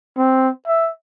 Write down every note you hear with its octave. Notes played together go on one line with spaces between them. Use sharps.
C4
E5